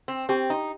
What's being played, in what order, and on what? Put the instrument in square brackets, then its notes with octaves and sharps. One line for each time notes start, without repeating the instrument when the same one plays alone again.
[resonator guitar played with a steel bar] C4
[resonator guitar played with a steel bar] C4 [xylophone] G4
[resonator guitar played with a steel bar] D#4